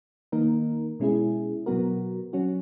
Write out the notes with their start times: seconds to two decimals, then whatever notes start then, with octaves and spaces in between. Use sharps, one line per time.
0.32 D#3 A#3 D#4 A#4
1.00 B2 G#3 C#4 E4 G#4
1.66 B2 F#3 B3 F#4 A#4
2.33 F#3 C#4 F#4